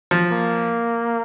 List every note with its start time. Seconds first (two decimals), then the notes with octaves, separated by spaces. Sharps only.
0.11 F3
0.32 A#3